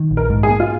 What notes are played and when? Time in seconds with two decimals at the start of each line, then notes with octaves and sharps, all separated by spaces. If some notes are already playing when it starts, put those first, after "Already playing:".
Already playing: D#3
0.11 A#1
0.17 A#4
0.30 G#2
0.43 G#4
0.49 A#3
0.60 F4